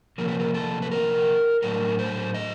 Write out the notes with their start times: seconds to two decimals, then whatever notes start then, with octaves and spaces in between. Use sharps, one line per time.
0.18 C3 F3 A#3 C#4 A#4
0.29 B4
0.39 A#4
0.54 A4
0.82 B4
0.91 A#4
1.63 A2 F#3 A3 D4 A#4
1.99 C5
2.34 D#5